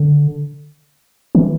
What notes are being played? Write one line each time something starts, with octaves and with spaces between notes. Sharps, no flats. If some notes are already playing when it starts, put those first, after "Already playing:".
Already playing: D3
D3
E3